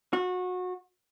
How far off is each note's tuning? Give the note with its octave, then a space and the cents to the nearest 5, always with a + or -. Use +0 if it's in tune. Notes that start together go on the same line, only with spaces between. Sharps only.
F#4 -25